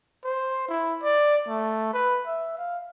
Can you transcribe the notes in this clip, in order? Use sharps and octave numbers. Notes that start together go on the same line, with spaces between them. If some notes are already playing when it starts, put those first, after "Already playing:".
C5
E4
D5
A3
B4
E5
F5